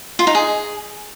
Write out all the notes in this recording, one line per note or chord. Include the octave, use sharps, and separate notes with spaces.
F4
D#4
G#4